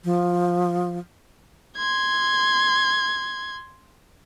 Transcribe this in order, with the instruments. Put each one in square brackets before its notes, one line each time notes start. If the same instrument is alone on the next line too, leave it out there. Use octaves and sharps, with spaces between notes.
[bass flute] F3
[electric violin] C6 G#6